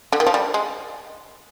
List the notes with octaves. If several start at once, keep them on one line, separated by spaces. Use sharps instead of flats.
D3
D#3
F3
G3
G#3